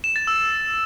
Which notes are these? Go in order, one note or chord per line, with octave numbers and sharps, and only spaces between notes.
E7
A6
E6